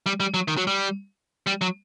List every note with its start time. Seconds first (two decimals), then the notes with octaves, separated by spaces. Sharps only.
0.06 G3
0.20 G3
0.34 F#3
0.48 D#3
0.58 F#3
0.67 G3
1.47 G3
1.61 F#3